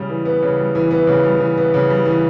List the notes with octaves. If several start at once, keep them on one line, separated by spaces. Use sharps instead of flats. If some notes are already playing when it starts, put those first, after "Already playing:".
Already playing: C#3 G3
E3
B3
C#3
G3
E3
B3
C#3
G3
E3
B3
C#3
G3
E3